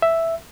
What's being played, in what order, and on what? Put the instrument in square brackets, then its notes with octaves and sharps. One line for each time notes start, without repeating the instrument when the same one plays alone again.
[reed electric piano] E5